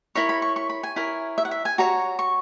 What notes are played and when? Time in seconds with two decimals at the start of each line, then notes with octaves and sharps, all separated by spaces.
0.15 E4 A#4 C#5 B5
0.29 B5
0.42 C#6
0.56 C#6
0.69 B5
0.83 G#5
0.96 E4 A#4 C#5
1.38 E5
1.45 F#5
1.51 E5
1.65 G#5
1.78 F#4 C#5 A#5
2.19 C#6